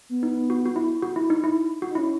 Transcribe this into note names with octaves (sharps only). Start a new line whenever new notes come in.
B3
D#4
F#4
F#4
E4
F#4
E4
D#4
E4
F#4
D#4
C#4 E4